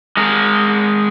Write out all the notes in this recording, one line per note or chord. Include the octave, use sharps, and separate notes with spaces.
G#3 A#4